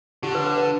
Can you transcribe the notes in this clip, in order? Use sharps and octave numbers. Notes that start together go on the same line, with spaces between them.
D3 G4
B4
B4
B4